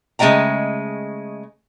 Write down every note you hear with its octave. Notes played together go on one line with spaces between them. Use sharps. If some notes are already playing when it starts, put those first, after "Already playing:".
C#3 G#3 A3 D#5 G5 A#5